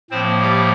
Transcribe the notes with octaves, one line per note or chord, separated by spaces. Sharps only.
A2 F3 A#3 C4 C5
G3 G4